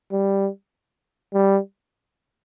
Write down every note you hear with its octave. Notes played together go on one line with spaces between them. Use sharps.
G3
G3